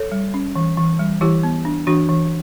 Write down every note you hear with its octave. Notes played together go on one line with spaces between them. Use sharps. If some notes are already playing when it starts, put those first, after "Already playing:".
Already playing: A4 C#5
G3
C#4
E3
E3
G3
E3 E4 G4
B3
D4
E3 D4 F#4
E3